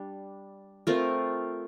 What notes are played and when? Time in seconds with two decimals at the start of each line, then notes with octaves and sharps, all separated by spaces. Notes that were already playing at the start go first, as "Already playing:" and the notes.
Already playing: G3 D4
0.87 A3 C4 F4 A#4